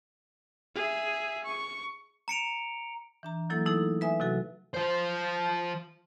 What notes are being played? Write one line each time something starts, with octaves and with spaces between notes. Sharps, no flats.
G#4 E5
C#6
A#5 C#7 D7 F7
E3 D4 A#5
E3 F#3 A#3 E4 A4
A3 D#4 E4 G#4 A4
B4 E5 G#5 D#6
C3 F3 F#3 F#4 A4
F3 C5